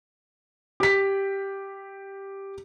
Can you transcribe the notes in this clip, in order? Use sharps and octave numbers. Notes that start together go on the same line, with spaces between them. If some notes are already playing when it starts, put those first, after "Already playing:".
G4 B6